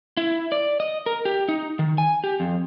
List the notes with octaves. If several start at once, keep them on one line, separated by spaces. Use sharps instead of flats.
E4
D5
D#5
A#4
G4
D#4
D#3
G#5
G4
F2